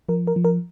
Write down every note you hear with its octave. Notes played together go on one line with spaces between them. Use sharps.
F3 A#4
A#4
F3
A#4